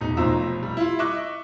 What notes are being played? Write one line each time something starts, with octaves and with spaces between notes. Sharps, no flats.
E1 D#4
F1 B1 F3 F4 A#5 E6
G3
E4 F4
D#5 E5 C#6 D6 F#6